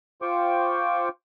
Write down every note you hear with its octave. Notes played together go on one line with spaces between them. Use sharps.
F4 C5 G5 C#6 D6